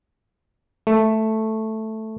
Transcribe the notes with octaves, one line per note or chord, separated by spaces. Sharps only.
A3